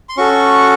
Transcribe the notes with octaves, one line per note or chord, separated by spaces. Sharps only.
C6
C#4 F#4 A4 C#6